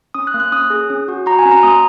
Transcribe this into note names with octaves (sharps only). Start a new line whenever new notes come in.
C#4 D#6
F#6
A#3
F#6
C#4 D#6
G#4
C#4
F#4
F#4 A#5
G#5
C#4
A#5
A#3 D#6